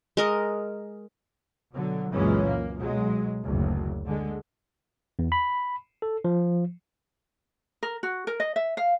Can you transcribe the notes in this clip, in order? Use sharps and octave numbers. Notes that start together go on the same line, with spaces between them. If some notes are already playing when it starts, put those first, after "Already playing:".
G#3 A#4 D#5
B2 D3 F#3
C#2 F#2 A#2 E3 G#3 C#4
A#3
B1 F#3 G#3
F#1 D2
D3 G#3
E2
B5
A4
F3
A#4
F#4
A#4
D#5
E5
F5